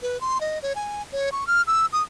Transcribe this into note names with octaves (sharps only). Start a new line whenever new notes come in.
B4
C6
D#5
C#5
G#5
C#5
C#6
F6
E6
D#6